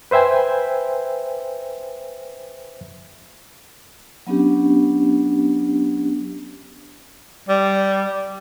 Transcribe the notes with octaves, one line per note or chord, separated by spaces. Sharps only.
B4 C5 E5 G5 G#5
F#3 B3 C#4 D4 G4
G3